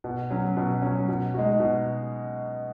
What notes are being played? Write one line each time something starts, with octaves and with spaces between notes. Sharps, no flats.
B2
F#3 C#4
B2
F#3 C#4
B2
G#3 D#4 F#4
B2